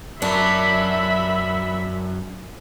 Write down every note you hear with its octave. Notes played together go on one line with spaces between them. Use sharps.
F#2 D4 A#4 E5 B5